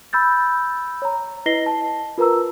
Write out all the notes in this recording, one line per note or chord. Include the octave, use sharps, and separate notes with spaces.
B5 E6 G6 A6
C#5 A#5
E4 B4 D#5 A#6 C7 G7
A5
F4 A#4 B4 A#5 E6